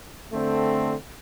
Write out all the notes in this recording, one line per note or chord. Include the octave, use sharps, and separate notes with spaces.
D3 A3 C4